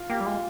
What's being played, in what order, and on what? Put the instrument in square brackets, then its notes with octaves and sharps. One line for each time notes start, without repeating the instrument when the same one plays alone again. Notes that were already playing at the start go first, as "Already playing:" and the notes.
Already playing: [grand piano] F4
[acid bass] A#3 [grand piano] G4
[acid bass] G3
[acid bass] G#3 [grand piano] F4